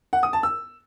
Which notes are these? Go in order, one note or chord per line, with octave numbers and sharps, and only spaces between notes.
F#5
D#6
A5
E6